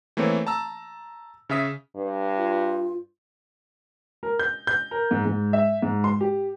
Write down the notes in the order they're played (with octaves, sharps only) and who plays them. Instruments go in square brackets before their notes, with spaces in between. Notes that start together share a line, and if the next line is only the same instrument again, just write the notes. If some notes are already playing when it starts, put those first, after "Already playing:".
[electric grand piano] E3 A3 A#3 C4 C#5
A5 A#5 E6
C#3 C#4 E5 D#6 B6
[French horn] G2
[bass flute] F4
[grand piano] A#4
G6
G6
A#4
G#2
G#2
E5
G#2
C6
G4